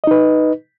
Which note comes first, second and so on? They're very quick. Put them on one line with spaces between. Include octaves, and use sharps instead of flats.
D#5 D#4 B4